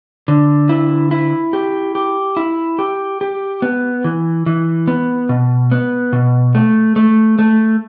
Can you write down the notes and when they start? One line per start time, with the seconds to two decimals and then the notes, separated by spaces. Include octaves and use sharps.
0.28 D3
0.69 E4
1.11 E4
1.53 G4
1.95 G4
2.37 E4
2.79 G4
3.21 G4
3.62 B3
4.04 E3
4.46 E3
4.88 B3
5.29 B2
5.72 B3
6.13 B2
6.55 A3
6.96 A3
7.39 A3